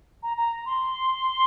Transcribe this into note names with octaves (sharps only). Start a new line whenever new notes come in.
A#5
A#5
C6